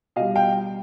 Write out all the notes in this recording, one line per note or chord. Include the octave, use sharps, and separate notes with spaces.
B2 G3 D#5 F5
F5 G5